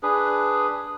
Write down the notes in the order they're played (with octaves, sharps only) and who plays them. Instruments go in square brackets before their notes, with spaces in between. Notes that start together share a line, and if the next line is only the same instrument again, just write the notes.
[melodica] D4 G#4 B4